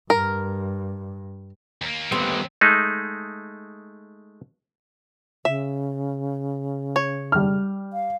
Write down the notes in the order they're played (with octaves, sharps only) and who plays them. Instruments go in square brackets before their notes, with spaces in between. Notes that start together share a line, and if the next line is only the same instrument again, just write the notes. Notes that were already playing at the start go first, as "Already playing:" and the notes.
[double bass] G2 [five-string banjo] A#4
[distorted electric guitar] D#2 A#3
[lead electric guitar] G3 B3 [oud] C4
[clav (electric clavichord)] G#3 A3 D#4
[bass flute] C#3 [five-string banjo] E5
[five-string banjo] C#5
[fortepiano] G3 F6
[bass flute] F5